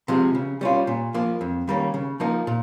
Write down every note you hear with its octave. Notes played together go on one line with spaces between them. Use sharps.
C3 F3 G#3
C#3
G3 C#4 F4
A#2
F3 A#3
F2
D#3 G3 A#3 C#4
C#3
F3 A#3 D#4
A#2